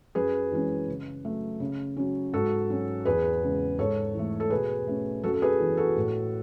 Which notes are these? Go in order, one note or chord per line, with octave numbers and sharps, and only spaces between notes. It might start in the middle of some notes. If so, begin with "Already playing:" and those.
F#2 G#4 B4
E3 G#3 C#4
C#3
F#3 A3
C#3
F#3 C#4
G#2 F#4 A4
F#3 C#4
E2 G#4 B4
C#3 G#3
G#2 A4 C#5
E3
A3
A4
B2 G#4 B4
A3 C#4
F#2 F#4 A4
A4
G#4 B4
E3 B3
F#4 A4
A2